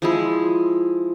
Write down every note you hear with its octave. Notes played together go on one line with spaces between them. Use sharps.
F3 G#3 E4